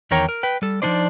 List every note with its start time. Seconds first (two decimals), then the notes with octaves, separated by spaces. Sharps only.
0.11 E2 D#3 A#4 C#5 G5 A#5
0.29 A#4
0.43 B4 G5
0.62 G3 A4
0.82 F3 F#3 D4 D#4 C5 D5